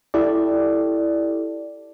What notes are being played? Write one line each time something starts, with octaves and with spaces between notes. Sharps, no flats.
E4 G4 A4 D5